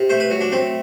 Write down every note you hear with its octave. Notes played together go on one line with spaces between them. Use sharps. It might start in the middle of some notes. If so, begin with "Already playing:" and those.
Already playing: C3
A3 C5
B4
F#3
D4
A3 C4